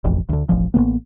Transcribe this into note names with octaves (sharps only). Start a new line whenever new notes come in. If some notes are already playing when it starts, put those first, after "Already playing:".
E1 A1 F2
D2 D3
E1 A1 F3
A1 D#3 A#3 B3